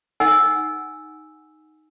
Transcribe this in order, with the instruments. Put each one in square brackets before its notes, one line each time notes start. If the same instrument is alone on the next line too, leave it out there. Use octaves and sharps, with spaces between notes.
[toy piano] D#4 F#5 G#5 E6